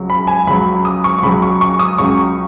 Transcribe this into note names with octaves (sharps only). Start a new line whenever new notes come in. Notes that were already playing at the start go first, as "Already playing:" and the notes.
Already playing: C#2 C#3 F#3
B5
G#5
C#2 C#3 F#3 B5
D#6
C#6
C#6
C#2 C#3 F#3 B5
C#6
C#6
D#6
C#2 C#3 F#3 C#6